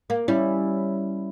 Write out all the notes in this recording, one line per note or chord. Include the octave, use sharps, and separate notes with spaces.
A#3
G3 C#4 E4